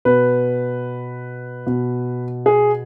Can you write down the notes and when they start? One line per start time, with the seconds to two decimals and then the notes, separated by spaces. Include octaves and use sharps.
0.05 B2 B4
1.66 B2
2.46 G#4